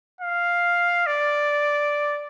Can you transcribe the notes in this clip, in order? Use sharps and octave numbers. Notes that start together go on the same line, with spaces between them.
F5
D5